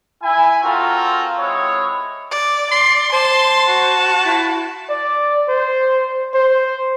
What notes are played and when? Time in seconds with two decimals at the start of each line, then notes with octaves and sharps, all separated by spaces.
0.23 E4 G#5
0.62 C4 F4 F#4 A4 A#4
1.38 G#3 C4 E4 C#5
2.31 D5
2.71 D5 C6
3.13 C5 A5 C6
3.68 F#4
4.26 E4
4.90 D5
5.48 C5
6.34 C5